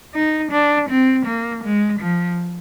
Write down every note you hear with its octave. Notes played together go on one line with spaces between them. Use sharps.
D#4
D4
C4
A#3
G#3
F3